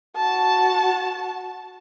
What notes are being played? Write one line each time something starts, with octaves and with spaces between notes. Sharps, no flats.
F#4 A5